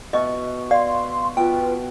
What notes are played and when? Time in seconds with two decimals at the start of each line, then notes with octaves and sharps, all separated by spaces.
0.13 B2 D#5 E5 C#6
0.71 D5 F5 C6
1.37 B2 F4 B4 G5